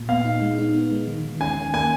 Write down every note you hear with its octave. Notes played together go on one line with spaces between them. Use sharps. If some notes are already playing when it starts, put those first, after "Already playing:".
Already playing: A#2
B3 F5
D#4
G#3
D#4
B3
G#3
D#3
D#3
C#4 G#5
D#3
A#3 G#5